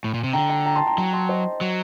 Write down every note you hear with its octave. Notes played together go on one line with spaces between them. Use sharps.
A2
A#2
C3
D3 G5 A#5
G5 A#5
G5 A#5
A5 C6
G5 A#5
F#3 G5 A#5
A5 C6
C5 D#5
F#3